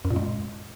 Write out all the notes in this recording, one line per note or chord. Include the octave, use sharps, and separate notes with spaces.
F#2
A#2
G#3